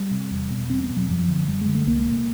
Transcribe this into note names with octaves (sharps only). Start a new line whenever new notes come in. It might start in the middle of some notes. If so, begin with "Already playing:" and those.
Already playing: G3
C3
E2
B2
E2 C4
B3
B2
F#3
F#2 F3
D3
F#2 G3
G#3
D3
A3
C2 A#3
A#2